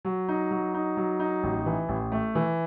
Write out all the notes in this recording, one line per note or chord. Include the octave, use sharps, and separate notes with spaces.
F#3
D#4
F#3
D#4
F#3
D#4
A1
E3
A1
A3
E3